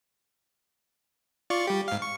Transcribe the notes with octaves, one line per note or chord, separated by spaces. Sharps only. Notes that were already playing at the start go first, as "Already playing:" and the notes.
F4 D5 C#6
G3 G4
G#2 F5
C#6